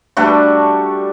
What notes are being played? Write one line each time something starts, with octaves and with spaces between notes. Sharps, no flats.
G3 A3 D4 F#4